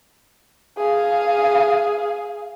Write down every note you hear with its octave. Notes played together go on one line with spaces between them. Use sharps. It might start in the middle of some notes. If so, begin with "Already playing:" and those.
G#4 F5